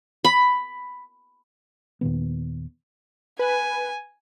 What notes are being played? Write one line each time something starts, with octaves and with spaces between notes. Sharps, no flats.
B5
D#2 A#2 D#3 B3
B4 G#5